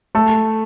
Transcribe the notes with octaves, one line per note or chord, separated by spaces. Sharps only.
A3 A4